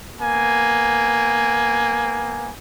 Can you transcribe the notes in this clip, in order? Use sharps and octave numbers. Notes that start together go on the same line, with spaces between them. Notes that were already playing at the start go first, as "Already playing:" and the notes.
A#3 B3 G#5